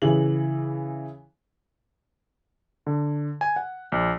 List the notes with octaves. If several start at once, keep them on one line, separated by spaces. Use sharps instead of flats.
C#3 E3 F#7
D3
G#5
F#5
A#1